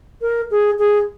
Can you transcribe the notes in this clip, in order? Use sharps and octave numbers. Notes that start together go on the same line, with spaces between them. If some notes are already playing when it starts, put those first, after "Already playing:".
A#4
G#4
G#4